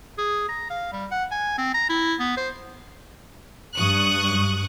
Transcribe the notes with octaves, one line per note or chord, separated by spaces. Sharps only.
G#4
A#5
F5
G3
F#5
G#5
C4
A#5
E4
B3
C5
G2 C#6 D#6 F#6